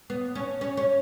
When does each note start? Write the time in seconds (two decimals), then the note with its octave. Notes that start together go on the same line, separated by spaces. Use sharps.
0.10 B3
0.35 C#4
0.61 C#4
0.77 C#4